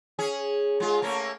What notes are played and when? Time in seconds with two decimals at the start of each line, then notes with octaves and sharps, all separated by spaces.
0.19 C#4 G#4
0.80 G#3 F4
1.02 A3 A#3 C#4